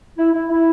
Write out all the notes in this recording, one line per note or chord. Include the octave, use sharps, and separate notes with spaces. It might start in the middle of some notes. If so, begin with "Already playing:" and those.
E4
E4
E4